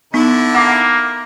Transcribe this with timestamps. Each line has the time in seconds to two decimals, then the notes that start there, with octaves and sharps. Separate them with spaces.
0.14 D3 B3 D#4 E4
0.55 A#3 F#5 D6